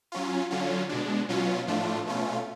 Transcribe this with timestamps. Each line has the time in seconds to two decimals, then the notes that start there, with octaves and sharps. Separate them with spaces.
0.12 F#3 C#4 F4
0.51 D3 F#3 C#4 F4
0.89 B2 G#3 D4
1.29 B2 F#3 C#4 F4
1.67 A2 F3 A3 D4 F4
2.06 B2 A3 C#4 F4